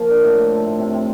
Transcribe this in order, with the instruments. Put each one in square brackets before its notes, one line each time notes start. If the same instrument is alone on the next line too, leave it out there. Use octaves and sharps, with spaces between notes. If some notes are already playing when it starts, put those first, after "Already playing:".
Already playing: [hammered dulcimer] F3 A#3
D3
A2
A3
F3
A2
C3
C4